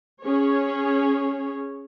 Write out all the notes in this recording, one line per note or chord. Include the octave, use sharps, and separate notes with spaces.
C#4 G#4 C#5